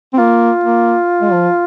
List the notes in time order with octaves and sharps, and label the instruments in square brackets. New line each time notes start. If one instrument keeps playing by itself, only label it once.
[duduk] C4
[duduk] A#3 [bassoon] F4
[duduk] A#3
G#3
F3